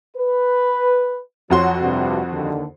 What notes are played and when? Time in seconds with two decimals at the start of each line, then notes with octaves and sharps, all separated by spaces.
0.16 B4
1.50 F2 F#3 F#4 C6
1.82 G2 C3
2.32 D#2 D3 D#3